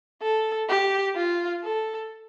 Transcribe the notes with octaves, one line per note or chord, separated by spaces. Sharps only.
A4
G4
F4
A4